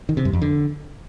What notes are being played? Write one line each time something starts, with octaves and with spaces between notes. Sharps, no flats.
D#3
C3
F#2
F2
D3